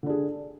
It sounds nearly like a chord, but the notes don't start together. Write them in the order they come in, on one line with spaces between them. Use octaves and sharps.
D3 D4 G#4